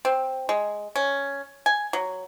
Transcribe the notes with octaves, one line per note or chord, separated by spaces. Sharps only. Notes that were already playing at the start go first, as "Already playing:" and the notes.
C4
G#3
C#4
G#5
F#3